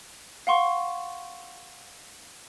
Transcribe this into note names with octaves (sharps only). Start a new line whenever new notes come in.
F5 F#5 C6 C#6